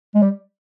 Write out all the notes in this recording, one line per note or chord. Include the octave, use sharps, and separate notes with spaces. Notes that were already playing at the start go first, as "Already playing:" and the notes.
G#3
G3